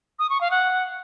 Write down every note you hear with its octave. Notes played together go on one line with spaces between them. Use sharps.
D#6
C#6
F5
F#5